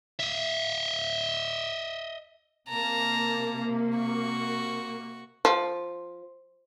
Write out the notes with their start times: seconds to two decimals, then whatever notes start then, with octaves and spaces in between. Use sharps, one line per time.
0.19 D#5 E5
2.69 C3 A#3 A5 A#5
3.96 F#4 C#6
5.45 F3